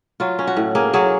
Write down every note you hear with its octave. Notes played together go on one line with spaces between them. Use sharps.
F#3 F4
C#4
F#4
A2
A#3 G#4
F#3 G#4